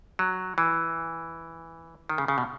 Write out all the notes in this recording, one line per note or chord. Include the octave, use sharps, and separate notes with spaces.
F#3
E3
D#3
C#3
C#3
B2